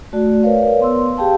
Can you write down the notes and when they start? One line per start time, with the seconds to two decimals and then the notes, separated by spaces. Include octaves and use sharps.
0.13 A3 F#4 D5
0.43 A#4 B4 C#5 D5 F5
0.80 B3 C6 E6
1.18 G4 G#4 F5 G5 A5